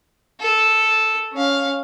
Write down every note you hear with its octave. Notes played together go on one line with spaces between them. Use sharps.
A4
C#4 F5